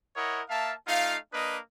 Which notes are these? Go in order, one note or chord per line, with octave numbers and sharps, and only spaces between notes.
E4 A#4 C#5 D#5 F#5
A#3 E5 F5 A5
A3 D#4 F4 F5
A#3 D4 B4 D#5